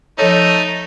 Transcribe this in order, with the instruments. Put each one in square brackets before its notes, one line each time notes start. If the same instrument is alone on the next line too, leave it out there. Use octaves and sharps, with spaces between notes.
[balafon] F3 A4 C#5 [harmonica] A3 D#4